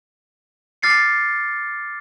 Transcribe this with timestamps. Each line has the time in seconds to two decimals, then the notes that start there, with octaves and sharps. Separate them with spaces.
0.82 D6 F6 A6 C7 C#7